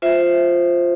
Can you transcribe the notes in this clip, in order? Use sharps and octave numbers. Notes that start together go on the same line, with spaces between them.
F4 C5 E5